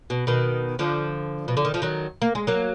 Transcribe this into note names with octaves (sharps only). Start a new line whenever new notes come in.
B2
B2 D#3
D3 F3
B2
D3
D#3
F3
D#3 F#3
A#3
G#3
F#3 A#3